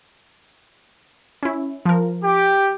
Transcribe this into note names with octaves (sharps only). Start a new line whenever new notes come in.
C#4 E4
F3 A#4
G4